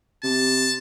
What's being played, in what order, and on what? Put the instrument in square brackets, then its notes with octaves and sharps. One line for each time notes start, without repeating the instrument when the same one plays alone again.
[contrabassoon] C3 [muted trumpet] A5